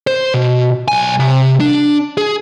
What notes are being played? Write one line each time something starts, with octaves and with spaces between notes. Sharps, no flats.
C5
B2
B1 G#5
C3
D4
G#4